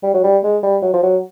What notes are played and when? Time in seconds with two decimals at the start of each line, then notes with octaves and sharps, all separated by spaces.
0.03 G3
0.14 F#3
0.24 G3
0.44 G#3
0.63 G3
0.82 F#3
0.93 F3
1.03 F#3